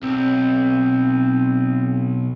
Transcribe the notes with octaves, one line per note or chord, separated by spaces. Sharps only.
B1 C4